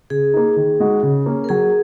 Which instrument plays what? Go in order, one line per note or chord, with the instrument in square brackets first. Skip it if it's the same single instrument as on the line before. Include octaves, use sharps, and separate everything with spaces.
[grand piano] C#3 [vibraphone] G#4
[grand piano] A#3 D#4
D#3
G#3 D#4 F#4
C#3
A#3 C#4
[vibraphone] A#4
[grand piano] F#3 [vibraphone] G#4